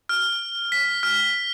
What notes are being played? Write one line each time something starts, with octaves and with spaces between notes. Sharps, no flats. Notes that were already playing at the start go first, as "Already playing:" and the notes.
F6
B6
F6